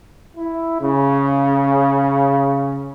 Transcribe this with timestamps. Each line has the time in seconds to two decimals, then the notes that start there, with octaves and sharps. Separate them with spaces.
0.37 E4
0.81 C#3